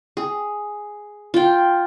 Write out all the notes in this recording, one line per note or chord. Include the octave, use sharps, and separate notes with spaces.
G#4
F4 G5